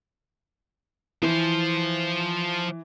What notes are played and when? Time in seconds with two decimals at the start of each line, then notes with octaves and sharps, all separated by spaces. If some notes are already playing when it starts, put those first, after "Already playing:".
1.23 E3 F3 C5